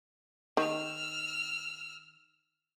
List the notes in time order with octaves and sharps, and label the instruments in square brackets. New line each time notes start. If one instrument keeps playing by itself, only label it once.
[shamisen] D#3 [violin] E6 F6